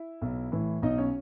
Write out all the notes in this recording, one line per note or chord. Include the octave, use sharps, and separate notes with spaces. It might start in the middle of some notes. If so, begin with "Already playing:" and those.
Already playing: E4 E5
B1
A2 E3
B1 D#4 D#5
C#4 C#5